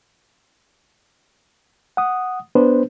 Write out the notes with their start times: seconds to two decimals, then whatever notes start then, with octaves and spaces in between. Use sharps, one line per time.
1.97 F#5 D#6
2.55 B3 D4 B4 C5